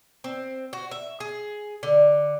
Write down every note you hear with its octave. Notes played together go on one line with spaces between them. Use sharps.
C4
F#4
E5
G#4
D3